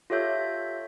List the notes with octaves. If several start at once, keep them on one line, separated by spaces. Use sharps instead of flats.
F4 G4 A4 C#5 E5 G6